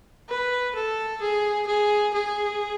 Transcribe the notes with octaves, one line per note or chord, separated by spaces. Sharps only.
B4
A4
G#4
G#4
G#4